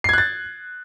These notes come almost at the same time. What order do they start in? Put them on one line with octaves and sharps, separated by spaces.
C7 G#6 F#6 A6